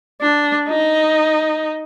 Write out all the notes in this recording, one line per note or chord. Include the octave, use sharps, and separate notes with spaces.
D4
D#4